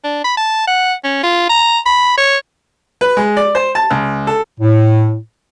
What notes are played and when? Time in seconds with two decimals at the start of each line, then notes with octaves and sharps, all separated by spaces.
0.04 D4
0.24 B5
0.37 A5
0.68 F#5
1.04 C#4
1.23 F4
1.49 A#5
1.86 B5
2.18 C#5
3.01 B4
3.17 G#3
3.37 D5
3.55 C5
3.75 A5
3.90 C#2
4.27 A4
4.60 A2